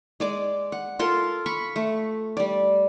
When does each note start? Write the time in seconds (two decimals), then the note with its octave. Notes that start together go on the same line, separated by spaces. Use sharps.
0.20 G#3 D5 D6
0.72 F#5
0.99 F4 A4 A#4 C6
1.46 B5 C#6
1.76 A3
2.37 G3 D5